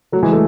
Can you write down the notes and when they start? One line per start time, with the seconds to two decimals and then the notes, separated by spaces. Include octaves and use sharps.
0.12 F#3 A3
0.23 E3 G#3
0.33 A3